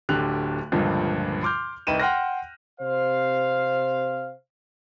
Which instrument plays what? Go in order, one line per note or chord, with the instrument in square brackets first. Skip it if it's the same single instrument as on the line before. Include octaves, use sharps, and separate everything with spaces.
[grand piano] D1 D3 G4 G5 F#6 F7
C#2 G2 A#2 D3 F3
C6 D6 F6 G6
C2 D#4 B4 G5 D#7 E7
F#5 G5 C6 F6 F#6 A#6
[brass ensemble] C3 C5 F5